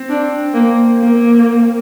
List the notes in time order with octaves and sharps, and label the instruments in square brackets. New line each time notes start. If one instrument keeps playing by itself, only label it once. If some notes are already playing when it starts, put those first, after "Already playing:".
Already playing: [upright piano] C4
[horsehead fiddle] D4
A#3
A#3